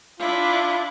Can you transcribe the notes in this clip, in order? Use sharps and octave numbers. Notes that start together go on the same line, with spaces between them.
D4 E4 F4